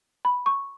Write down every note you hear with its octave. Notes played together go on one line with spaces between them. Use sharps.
B5
C#6